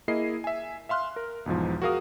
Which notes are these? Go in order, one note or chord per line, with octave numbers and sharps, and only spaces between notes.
A#3 E4 G#4 A#4 D#5 C7
E5 G#5
E5 F5 C6 F6 F#6
A#4
B1 E2 G#2 F3
F#4 G#4 A#4 F5 D#6